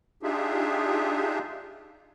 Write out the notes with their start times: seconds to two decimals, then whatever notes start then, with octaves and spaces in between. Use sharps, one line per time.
0.23 D4 D#4 F4 G4 G#4 E5